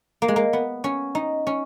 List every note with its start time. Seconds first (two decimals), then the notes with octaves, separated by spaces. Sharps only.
0.22 A#3
0.28 G#3
0.36 A#3
0.53 B3
0.84 C#4
1.15 D#4
1.47 C#4